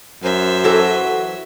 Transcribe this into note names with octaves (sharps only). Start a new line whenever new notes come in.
F#2 C5 E5
E3 F#3 F#4 A4